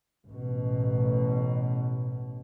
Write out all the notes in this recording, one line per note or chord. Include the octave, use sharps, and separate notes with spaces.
A1 B2